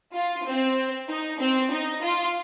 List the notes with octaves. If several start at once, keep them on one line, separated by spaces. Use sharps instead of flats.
F4
C4
D#4
C4
D#4
F4